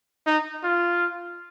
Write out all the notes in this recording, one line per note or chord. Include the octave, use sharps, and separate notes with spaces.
D#4
F4